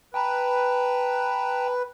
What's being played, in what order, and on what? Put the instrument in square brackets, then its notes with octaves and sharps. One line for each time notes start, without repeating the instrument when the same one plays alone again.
[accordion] B4 [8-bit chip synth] G5 A5 A#5